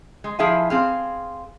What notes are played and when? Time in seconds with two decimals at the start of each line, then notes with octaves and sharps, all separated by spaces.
0.24 G#3
0.39 F3 E4 G#4 E5 F5 G#5
0.70 C4 G#4 F5